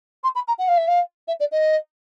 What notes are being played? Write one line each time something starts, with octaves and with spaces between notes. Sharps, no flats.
C6
B5
A#5
F#5
F5
E5
F5
E5
D5
D#5